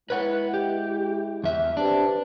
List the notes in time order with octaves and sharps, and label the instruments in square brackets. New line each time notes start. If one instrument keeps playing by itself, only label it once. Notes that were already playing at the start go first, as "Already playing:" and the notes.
[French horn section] G#3 E4 [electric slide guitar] B4 C#5 F#5
[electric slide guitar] G4
E2 E5
[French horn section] C4 G4 B4 [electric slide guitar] D4